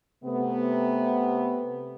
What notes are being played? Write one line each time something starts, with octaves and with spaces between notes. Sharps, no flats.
C3 A3 B3